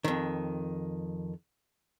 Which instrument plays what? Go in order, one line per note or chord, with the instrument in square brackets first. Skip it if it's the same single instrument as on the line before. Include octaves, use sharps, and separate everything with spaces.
[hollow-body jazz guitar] F2 D#3